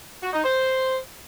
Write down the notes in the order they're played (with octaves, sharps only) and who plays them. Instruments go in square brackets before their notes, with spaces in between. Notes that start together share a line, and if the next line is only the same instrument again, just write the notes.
[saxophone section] F#4
D#4
C5